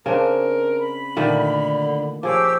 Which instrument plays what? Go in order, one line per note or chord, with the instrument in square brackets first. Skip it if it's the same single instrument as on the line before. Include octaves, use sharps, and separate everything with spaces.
[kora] C#3 C4 D4 [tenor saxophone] A#4
[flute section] B5
[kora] A#2 D#3 A3 [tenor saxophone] D3
[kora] F3 G#4 C#5 [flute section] G4 D6 E6